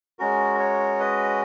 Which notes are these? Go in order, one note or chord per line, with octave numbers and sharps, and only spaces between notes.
G#3 C#4 F#4 A#4
A#4 C#5
B4 D#5